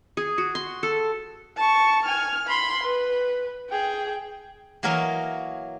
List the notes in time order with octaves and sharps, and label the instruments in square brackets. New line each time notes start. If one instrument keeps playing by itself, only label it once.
[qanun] G#4
F#4
C6
A4
[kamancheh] A5 C#6
G#5 F6
B5 C6
B4
G#4 G5
[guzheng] E3 F#3 A#3 A#4 C#5 D#5